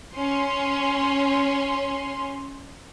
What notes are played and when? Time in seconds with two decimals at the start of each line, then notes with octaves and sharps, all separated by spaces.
0.14 C#4 C6